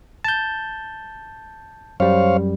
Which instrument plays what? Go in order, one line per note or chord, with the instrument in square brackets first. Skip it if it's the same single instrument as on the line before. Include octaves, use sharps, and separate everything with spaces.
[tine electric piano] A5 G6
[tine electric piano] F#2 G3 [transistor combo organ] C5 C#5 F5